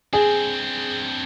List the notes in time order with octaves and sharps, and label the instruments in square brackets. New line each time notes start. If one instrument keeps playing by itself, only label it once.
[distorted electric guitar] C4 D4 [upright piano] G#4